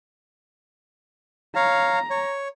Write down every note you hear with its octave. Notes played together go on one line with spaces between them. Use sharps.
C#5 F5 A#5
C#5